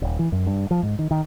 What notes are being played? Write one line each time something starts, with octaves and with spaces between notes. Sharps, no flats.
D#1
E3
F#2
G2
F3
G#2
D#3
D#3